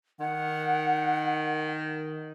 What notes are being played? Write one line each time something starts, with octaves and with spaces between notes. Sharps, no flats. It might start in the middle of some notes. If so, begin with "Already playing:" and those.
D#3 F#5